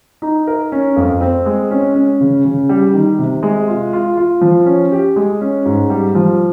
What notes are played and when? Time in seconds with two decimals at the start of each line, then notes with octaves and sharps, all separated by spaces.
0.22 D#4
0.47 A#4
0.72 C#4
0.96 F2
1.21 C4
1.46 G#3
1.71 C#4
1.95 C#4
2.21 C#3
2.45 C#3
2.69 G3
2.94 D#3
3.19 C3
3.43 G#3
3.68 F4
3.93 F4
4.17 F4
4.41 F3
4.66 C#4
4.92 G4
5.16 G#3
5.41 C#4
5.66 G#2
5.90 G3
6.15 F3